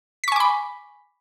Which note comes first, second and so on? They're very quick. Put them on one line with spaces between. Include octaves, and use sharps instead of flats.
B6 C#6 G#5 D6 B5